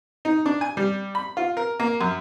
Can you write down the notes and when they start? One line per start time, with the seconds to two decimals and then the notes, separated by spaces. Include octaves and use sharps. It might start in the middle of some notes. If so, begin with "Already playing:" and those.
0.25 D#4
0.46 D4
0.61 G#5
0.77 G3
1.15 B5
1.37 F4
1.57 A#4
1.80 A#3
2.01 F#2